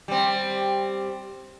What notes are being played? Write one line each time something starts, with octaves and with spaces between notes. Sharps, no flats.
G3 C4